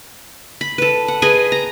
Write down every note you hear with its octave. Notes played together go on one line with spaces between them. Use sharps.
B5
A4 B4
F#5
G#4 B4 D#5 G#5
A#5